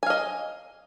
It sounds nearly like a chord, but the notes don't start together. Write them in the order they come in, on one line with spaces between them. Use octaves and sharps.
G#5 F5 D#5